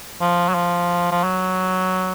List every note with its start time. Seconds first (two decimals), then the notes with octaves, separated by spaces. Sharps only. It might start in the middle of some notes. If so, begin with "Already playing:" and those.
0.20 F3
0.49 F#3
0.54 F3
1.11 F3
1.23 F#3